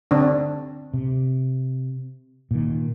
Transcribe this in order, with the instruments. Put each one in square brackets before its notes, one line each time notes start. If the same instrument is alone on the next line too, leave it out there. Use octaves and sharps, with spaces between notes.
[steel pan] D3 C4 D4
[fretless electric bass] C3
A#2 D#3